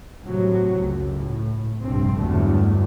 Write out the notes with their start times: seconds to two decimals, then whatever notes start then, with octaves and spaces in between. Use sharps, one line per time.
0.24 A2 C3 F#3
0.77 C#2 F#2
1.12 A2
1.80 F1 A#1 G2 C4
2.19 G1 E2 D3 F#3 G3 A3